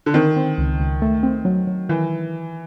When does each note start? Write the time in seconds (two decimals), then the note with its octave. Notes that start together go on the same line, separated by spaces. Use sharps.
0.06 D3
0.14 D#3 C4
0.36 C4
0.58 C#2
0.80 C#2
1.02 A3
1.23 C4
1.45 F#3
1.67 F#3
1.89 D#3 E3